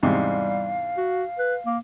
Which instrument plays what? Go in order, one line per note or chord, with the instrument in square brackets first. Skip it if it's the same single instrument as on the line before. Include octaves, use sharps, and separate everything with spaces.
[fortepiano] E2 G#2 C3 [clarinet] G3 [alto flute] F5
[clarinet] F#4
B4
A#3